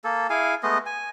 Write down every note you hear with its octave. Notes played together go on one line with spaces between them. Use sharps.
A#3 A4
E4 G#4 F5 G#5
G#3 A3 B3 D#5
G#5